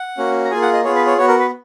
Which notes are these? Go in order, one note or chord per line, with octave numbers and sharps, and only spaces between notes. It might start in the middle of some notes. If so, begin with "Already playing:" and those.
Already playing: F#5
A#3 C#4 F#4
A#5
A#3 F4 G#4 G#5
F#5
D#5
B3 F4 G#4 C#5
B4
C#5
B3 F#4 C#5
A#4
B4